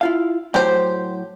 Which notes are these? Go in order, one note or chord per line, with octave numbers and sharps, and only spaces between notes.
E4 F4 F5
A2 F#3 G4 C5 G5